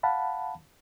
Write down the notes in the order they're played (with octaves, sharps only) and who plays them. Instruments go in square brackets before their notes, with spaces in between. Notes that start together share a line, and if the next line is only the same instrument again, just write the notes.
[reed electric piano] F5 F#5 A5 B5